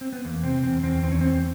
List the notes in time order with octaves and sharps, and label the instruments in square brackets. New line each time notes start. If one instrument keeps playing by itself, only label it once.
[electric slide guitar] C4
B3
E2 A#3
C3 C4
E2 C4
E2 C4
E2 C4
C#4
E2 C4